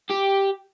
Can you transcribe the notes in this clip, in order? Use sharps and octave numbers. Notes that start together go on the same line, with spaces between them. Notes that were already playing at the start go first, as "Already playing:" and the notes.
G4